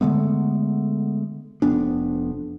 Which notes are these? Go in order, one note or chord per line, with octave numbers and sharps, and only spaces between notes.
D3 G#3 A3 B3
F1 F2 B3 D4